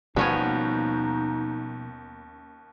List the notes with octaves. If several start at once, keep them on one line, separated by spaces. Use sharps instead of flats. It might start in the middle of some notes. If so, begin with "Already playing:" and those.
D#2 B2 F3 G3 B3 C#4 D#4 C#5